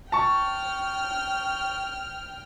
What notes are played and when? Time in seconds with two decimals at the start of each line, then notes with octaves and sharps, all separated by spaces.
0.12 G5 A5 C#6 F6